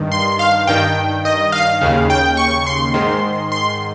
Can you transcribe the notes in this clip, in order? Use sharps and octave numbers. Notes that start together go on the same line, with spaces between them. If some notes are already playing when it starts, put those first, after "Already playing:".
Already playing: G2 D#3
C6
F5
G2 D#3 G5
D#5
F5
D#2 C#3
G5
C#6
C6
G#2 D#3
C6